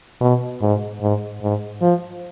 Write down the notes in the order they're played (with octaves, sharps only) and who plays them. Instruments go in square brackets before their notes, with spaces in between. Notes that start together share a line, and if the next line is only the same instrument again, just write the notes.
[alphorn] B2
G#2
G#2
G#2
F3